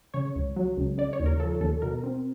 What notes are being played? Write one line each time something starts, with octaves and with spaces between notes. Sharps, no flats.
C#3 C#5
C#2
F#3
C#2
C#3 D5
C#5
D#2
A#4
F3 A4
D#2 A4
B2 A#4
C4